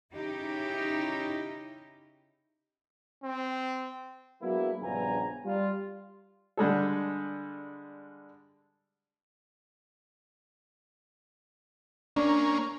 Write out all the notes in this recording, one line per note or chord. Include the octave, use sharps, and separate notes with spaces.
C#3 C#4 D#4 E4 G4
C4
F#3 G#3 A#3 B3 D4 E4
A#1 G2 C#3 B3 G#5 A#5
G3 F4
D3 G3 G#3 A4
A#3 C#4 D4